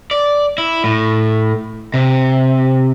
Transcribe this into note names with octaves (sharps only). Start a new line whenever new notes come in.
D5
E4
A2
C3